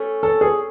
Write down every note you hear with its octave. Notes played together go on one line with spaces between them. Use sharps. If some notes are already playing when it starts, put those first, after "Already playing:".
Already playing: A3 C#4
A4
G#4